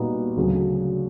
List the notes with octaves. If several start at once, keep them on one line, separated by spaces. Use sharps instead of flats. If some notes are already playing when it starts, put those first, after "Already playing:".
Already playing: A#2 G3 B3 D#4 F#4
D2 C#3 F#3